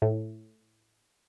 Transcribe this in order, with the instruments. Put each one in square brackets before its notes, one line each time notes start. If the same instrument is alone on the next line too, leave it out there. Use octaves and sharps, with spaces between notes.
[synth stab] A2